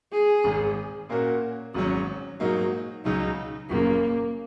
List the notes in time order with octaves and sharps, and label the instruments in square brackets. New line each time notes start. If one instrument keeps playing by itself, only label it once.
[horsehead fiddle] G#4
[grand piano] G#1 G#2 G#3
A#2 A#3 C#4 F#4 A#4
[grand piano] G#1 G#2 F#3 C#4 [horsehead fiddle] F#4
[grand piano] G#2 F#3 A#3 D#4 [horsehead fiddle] F#4
[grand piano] C#2 C#3 F#3 [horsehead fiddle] D#4
[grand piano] F#1 F#2 C#3 [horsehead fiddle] A#3